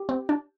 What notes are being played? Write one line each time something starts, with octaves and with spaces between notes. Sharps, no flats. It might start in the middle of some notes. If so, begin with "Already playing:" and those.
Already playing: G4
C4
D4